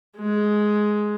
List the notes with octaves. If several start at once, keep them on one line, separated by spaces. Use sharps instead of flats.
G#3